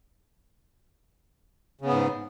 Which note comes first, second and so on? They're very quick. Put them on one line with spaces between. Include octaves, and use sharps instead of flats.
C#3 B3 G#2